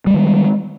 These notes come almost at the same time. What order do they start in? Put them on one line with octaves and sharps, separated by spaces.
G3 G#3 D#3